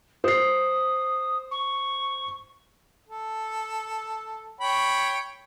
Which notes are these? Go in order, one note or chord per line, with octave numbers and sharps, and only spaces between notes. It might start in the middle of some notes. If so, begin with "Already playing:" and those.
C5 D#6 C7
C#6
A4
C#5 G5 B5